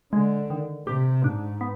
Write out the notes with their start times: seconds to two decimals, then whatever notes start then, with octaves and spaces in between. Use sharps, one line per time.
0.13 D3 G#3
0.50 D#3
0.87 C3 G4
1.24 G#2 D4
1.61 B3